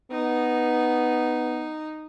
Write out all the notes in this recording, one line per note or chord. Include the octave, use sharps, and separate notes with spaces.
B3 D#4